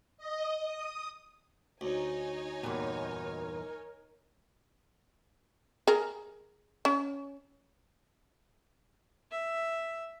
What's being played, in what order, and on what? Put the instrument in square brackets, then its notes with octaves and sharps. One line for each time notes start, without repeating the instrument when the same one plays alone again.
[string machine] D#5
D#6
[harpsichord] D2 [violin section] D#4 C#5 G#5
[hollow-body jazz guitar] E2 G2 A#2 [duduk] A#4
[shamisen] G#4 A#4
C#4
[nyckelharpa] E5